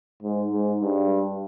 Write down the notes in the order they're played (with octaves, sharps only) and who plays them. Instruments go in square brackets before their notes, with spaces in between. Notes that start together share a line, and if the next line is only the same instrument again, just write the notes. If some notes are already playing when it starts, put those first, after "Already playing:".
[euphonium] G#2
G#2
G2